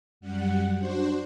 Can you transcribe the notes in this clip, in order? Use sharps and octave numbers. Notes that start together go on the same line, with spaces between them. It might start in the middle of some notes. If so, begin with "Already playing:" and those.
F#2 G3 F#5
D4 F#4 C5